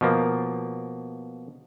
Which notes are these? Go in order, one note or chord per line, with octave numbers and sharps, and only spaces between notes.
B2 F3 A#3